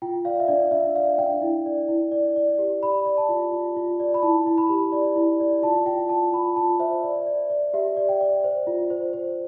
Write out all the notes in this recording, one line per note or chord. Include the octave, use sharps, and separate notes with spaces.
F4 G5
D5 F5
E5
D4 D5
D4 E5
D5 F5
D4 G5
E4
D5
E4
D5
D5
G4
D5 B5
D5
A5
F4
F4
F4
D5
B5
E4 A5
E4
B5
G4
D5
E4
D5
F4 A5
F4 G5
F4 A5
F4 B5
F4 A5
C5 E5
D5
D5
D5
G4 E5
D5
G5
D5
C5
F4
C5
C5